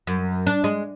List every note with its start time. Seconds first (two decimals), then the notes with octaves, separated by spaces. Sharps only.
0.07 F#2
0.47 D4
0.64 G#3